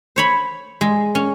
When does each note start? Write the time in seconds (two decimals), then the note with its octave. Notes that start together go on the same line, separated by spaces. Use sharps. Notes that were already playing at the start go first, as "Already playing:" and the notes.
0.16 C5 C#5 B5
0.81 G#3
1.15 C#4